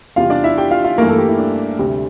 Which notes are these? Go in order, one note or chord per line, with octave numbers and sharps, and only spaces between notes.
E2 C3 G3 F4 F5
D4 D5
E4 E5
G4 G5
F4 F5
F4 F5
G2 E3 A3 A#3 A#4
A3 A4
G3 G4
E4
D4
D2 C3 G3